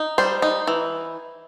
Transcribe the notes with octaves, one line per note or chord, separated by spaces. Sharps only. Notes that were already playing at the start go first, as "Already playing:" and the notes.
Already playing: D#4
G3 C5
D#4
E3